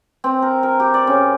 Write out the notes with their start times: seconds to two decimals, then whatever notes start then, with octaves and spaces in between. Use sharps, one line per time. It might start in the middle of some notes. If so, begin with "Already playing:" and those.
0.24 C4
0.42 A#4
0.63 A#4
0.80 G4
0.94 D5
1.07 C#3